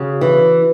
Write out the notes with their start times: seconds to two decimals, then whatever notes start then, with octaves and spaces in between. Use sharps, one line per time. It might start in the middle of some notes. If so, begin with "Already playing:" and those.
Already playing: C#3 F#4
0.21 E3